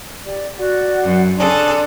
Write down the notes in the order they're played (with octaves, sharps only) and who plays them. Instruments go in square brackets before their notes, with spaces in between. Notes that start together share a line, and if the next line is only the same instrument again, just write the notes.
[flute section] G4 D5
F#4 D5 F#5
[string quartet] F#2
[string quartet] C#3 G#4 A4 [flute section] D4 C6